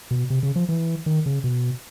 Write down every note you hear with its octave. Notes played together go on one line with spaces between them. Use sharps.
B2
C3
C#3
F3
E3
D#3
C#3
B2